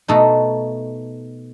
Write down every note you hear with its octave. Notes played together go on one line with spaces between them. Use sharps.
B2 A3 D#4 A4